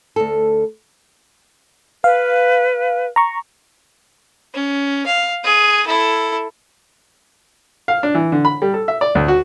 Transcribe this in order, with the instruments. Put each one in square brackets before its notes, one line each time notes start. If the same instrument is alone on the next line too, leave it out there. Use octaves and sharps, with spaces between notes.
[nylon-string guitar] D2 A4
[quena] B4 [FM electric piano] F5
[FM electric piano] A#5 C#6
[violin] C#4
F5
G#4 D#7
E4 A4
[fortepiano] F5
D4
E3
D3
B5
G3
A4
E5
D5
D2
F#4